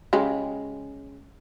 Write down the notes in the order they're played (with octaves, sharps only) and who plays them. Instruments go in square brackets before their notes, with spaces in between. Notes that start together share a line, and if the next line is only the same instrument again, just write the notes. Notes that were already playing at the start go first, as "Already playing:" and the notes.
[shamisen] C#3 G#3 G4